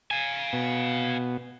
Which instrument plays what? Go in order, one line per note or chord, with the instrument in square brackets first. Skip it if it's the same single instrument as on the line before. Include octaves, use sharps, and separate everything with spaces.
[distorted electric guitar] F5 G#5
[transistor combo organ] B2 B3